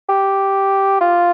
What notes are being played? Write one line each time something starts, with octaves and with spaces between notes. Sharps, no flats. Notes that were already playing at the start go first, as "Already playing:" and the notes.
G4
F4